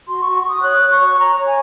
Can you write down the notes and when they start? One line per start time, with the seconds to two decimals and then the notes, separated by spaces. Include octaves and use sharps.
0.07 F#4 C6
0.22 F#4 C#6
0.36 C#6
0.44 F#4 D#6
0.62 C#5 F#6
0.81 C#5
0.91 C#6
1.00 F#4
1.18 C#5 A#5
1.36 C#5
1.46 G#5